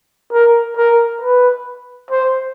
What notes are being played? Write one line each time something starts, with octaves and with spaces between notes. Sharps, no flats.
A#4
A#4
B4
C5